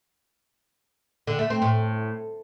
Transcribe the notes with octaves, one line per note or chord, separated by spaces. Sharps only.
D3
A3
C4
A2